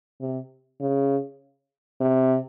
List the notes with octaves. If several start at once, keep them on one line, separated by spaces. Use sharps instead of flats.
C3
C#3
C3